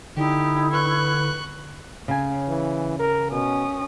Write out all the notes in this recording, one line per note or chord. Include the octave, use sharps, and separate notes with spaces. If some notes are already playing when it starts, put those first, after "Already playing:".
D3 D#4 E4 G4
B4 C#6 F#6
C#3 G#5
E3
A#4
B2 C#4 D#6